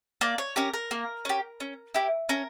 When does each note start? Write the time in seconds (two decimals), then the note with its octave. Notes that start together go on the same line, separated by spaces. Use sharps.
0.21 A#3 D5
0.38 C#5
0.56 C#4 G4 A#4
0.74 A#4
0.91 A#3
1.25 C#4 G4
1.60 C#4
1.94 E4 G4
2.29 C#4 A#4